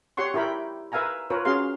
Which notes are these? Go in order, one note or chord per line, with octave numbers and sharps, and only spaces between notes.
G4 C#5 F#5 C6 C#6
E4 G4 A#4 G5 B5
A#4 B4 E5 F5 G#5 A#5
F4 A#4 B4 C#5
C#4 F#4 G#4 F5 C6